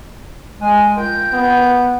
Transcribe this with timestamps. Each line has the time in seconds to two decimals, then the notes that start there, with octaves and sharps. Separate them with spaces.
0.61 G#3 G#5
0.97 F4 A#4 G5 G6
1.33 B3